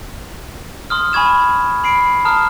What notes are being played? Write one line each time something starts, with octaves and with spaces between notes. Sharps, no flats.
C6 D#6 F6
G#5 B5 C#6 G#6 E7
B5 C7 D7
A5 A#5 D#6 F6